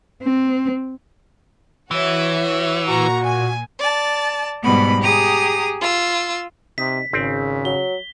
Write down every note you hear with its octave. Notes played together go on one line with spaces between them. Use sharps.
C4
E3 F#4 C#5 E5
A#2 F#4 A#5 C#6
G#5
D5 A5
G#2 B2 G3 B3 B5
G4 G#4 A#5 D#6
F4 E6
C3 D#4 B6
G#1 C#3 C4
F#3 G7